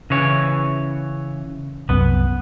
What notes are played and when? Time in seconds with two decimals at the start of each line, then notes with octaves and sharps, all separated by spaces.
0.10 C#3 E3 C#5
1.89 C2 F#2 B3